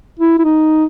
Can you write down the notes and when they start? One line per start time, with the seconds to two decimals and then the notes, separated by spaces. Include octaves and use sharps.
0.19 E4
0.38 E4
0.44 D#4